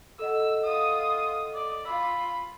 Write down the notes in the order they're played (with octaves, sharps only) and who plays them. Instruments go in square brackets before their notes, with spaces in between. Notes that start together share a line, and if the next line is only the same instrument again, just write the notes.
[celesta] A4 D#5 F#5 [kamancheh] E6
[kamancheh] F4 D#6
D5
[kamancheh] F4 B5 [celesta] E6